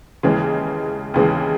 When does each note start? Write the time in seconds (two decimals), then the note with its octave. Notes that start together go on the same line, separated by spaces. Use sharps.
0.23 D#2 C#3 E3 G#3
1.14 D#2 C#3 E3 G#3